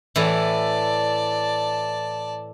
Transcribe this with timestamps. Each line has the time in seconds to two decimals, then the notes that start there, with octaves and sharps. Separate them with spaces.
0.16 A2 E3 D5 A5